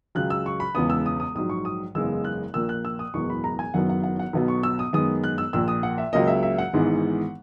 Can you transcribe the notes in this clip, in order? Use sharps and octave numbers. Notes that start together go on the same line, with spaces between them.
C#2 C#3 F#3 F#6
E6
C#6
B5
E1 E2 C#3 G#3 B3 D#6
E6
D#6
D#6
A#1 G#2 F#3 D#6
C#6
D#6
F#1 E2 C#3 G#3 B3 E6
F#6
A#1 A#2 A#3 E6
F#6
E6
D#6
F#1 E2 B2 G#3 B3 C#6
B5
A#5
G#5
F#1 F#2 D#3 F#3 B3 F#5
F#5
F#5
F#5
B1 B2 F#3 B3
C#6
E6
D#6
F#2 D#3 G#3 B3 D#6
F#6
E6
A#1 A#2 A#3 E6
D#6
F#5
E5
C#2 C#3 F#3 A#3 D#5
E5
E5
F#5
G#1 G#2 E3 G#3 B3